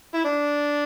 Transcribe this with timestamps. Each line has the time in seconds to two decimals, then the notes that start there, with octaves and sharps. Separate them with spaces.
0.14 E4
0.24 D4